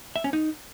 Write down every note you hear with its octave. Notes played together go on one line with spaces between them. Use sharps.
E5
C#4
D#4